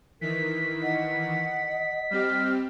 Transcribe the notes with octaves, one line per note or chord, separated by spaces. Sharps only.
D#3 E3 A#4 B6
D#5 F#5
G3 C4 G4 F6